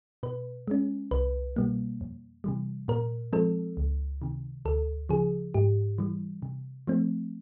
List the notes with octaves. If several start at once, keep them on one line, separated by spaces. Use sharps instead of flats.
B2 B4
G#3 C#4
C2 B4
B2 G3 A#3
F2
C3 E3 G3
A#2 A#4
F3 G#3 C4 A4
C#2
C3 D#3
D2 A4
C#3 F3 G#4
G#2 G4
E3 G3
C3
F3 A3 C4